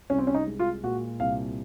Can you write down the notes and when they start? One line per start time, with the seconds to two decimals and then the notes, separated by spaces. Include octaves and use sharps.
0.10 C2 C#4
0.19 C4
0.27 C#4
0.34 D#4
0.47 G#3
0.59 F4
0.83 A#2 F#4
1.20 C2 F5